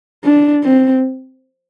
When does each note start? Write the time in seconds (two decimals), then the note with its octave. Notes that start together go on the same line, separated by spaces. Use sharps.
0.24 D4
0.64 C4